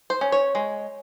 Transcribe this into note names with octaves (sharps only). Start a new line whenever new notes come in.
C5
C#4
C#5
G#3